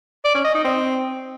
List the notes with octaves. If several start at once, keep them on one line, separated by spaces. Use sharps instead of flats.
D5
C#4
D#5
D#4
C4